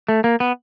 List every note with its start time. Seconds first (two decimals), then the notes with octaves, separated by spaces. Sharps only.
0.09 A3
0.24 A#3
0.40 B3